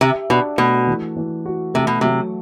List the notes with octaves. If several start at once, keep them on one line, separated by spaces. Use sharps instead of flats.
C3 G4
B2 D4
B2 A3
E3
E3
F#4
C3 A3
B2
C3 F#3